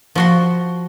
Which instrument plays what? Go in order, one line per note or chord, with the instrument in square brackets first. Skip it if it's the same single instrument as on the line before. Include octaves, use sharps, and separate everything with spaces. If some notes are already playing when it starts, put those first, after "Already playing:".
[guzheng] F3 F#4 C6